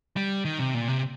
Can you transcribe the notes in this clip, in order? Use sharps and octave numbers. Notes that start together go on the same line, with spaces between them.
G3
D#3
C3
A#2
C3